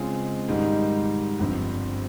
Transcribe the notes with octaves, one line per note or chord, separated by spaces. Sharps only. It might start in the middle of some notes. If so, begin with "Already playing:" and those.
Already playing: C#3 G#3 C4 F4 G#4
G#2 D#3 G3
G1 G2 F3 C4